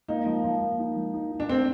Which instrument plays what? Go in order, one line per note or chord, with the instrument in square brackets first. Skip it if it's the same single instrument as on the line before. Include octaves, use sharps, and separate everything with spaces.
[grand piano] A#3 [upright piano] D#4
[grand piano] F3
F3
A#3
D#4
F3
D#4
D#4
[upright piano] D4
[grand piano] A3 [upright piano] C4